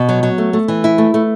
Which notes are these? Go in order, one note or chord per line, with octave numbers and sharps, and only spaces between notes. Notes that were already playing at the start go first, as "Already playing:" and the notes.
Already playing: B2
F#3
F#3
A3
A3
E3
E4
A3
A3